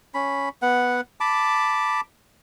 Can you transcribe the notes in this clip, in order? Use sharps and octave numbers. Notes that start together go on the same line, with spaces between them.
C#4 B5
B3 F#5
A5 B5 D6